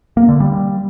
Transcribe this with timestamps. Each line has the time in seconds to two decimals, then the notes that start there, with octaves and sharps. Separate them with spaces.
0.17 A#3
0.29 D3
0.40 G3